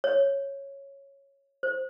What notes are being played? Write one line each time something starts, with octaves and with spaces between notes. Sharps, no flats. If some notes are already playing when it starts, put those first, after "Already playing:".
C#5
C5